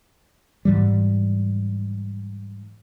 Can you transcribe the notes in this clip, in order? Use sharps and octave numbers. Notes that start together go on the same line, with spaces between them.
G#2 E3 G3